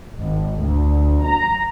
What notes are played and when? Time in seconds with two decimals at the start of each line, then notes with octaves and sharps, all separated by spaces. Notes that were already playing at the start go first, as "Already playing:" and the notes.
0.17 G#1
0.60 D2
1.24 A#5